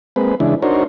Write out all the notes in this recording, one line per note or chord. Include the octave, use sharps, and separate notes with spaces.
G#3 A#3 C4 B4
C#3 E3 G#3 D4 E4
D4 D#4 F#4 A#4 C5 C#5